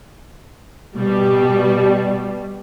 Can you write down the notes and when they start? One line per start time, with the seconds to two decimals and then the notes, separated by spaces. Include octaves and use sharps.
0.96 B2 G3